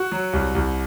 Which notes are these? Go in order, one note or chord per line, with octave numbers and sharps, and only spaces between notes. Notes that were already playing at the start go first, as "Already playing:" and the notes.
Already playing: F#4
F#3
C2
C2